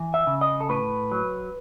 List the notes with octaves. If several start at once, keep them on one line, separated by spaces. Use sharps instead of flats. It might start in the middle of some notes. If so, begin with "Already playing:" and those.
Already playing: E3
E5
C#3
D#5
A4
A2 B4
F#3